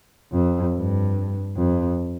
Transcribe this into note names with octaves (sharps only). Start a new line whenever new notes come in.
F2
G2
F2